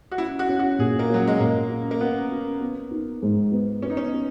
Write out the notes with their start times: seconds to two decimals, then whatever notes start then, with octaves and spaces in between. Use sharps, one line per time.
0.12 F#4
0.18 C#4 E4
0.39 F#4
0.49 C#4
0.59 F#4
0.79 A#2 G#4
0.99 A#3
1.10 F#3 C#4
1.27 G#3
1.40 A#2 A#3
1.70 C#4
1.91 A#3
2.01 B3 C#4
2.31 C#4
2.61 B3
2.91 D#4
3.23 G#2
3.52 B3
3.82 B3 C#4
3.90 D#4
3.97 C#4
4.14 B3